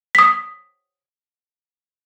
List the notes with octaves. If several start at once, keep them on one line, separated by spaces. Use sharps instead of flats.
D#6 B6